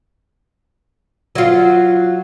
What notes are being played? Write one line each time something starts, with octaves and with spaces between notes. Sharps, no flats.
F#3 F4